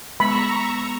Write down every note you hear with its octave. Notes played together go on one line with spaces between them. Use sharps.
G#3 B3 A#5 B5 C#6 E6